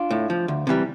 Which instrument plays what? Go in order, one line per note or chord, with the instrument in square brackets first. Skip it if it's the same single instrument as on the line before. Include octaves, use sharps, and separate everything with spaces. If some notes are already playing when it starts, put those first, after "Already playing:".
Already playing: [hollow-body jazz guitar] D4 F4
A2
F3
D2
C3 E3 G3